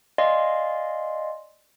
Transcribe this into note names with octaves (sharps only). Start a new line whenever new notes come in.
D5 D#5 F5 G#5 C6